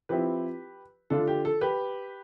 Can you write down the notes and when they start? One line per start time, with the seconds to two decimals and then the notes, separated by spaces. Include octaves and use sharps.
0.09 F3 C4 E4 G4 B4
1.10 D3 A3 D4 F4 A4
1.27 G4
1.45 A4
1.61 G4 B4